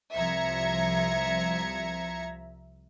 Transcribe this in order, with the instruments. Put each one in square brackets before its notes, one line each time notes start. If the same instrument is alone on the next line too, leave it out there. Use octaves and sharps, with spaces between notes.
[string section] C2 F3 E5 A#5 G#6 C#7